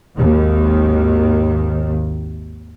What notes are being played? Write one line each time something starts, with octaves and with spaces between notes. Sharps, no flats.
G#1 D#2 D#3